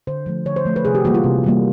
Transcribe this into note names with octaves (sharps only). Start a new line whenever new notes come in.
D3 C5
F3 A3
D3 C#5
C5
F3 A3
B4
C3 G#4
G4
E3 G3 A#3 F#4
F4
C3
E3 G3 A#3